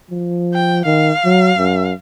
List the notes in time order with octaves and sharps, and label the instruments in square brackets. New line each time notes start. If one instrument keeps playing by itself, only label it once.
[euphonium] F3
[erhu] G5
[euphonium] D#3 [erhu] F5
[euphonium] F#3
F#2